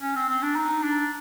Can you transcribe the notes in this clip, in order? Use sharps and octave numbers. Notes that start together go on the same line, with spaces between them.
C#4
C4
C4
D4
D#4
D4